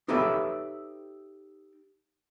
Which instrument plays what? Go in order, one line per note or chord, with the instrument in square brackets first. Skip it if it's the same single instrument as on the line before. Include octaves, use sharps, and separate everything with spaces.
[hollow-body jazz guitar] D#4 G4 A4 B4 C#5 E5